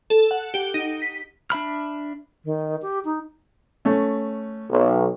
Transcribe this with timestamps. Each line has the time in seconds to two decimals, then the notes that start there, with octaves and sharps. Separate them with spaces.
0.10 A4
0.31 F#5
0.54 G4
0.74 D#4
1.02 B6
1.50 D4 E5 B5 F6
2.45 D#3
2.82 G4
3.05 D#4
3.85 A3 C#4
4.70 B1